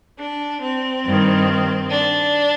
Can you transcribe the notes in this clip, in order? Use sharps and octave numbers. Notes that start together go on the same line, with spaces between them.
D4
C4
G2 D#3
D4